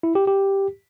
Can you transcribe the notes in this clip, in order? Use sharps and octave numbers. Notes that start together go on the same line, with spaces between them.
E4
G4
G4